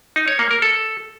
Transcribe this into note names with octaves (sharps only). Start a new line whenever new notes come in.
D#4
C#5
A#3
A#4
A4